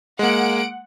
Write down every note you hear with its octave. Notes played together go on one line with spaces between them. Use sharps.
G#3 A#3 F#5 D7